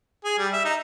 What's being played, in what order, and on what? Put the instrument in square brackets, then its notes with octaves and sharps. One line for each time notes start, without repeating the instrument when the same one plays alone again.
[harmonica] G#4
G3
E5
D#4